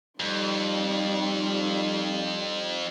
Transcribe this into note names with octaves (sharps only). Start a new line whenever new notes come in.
F2 G3 D#4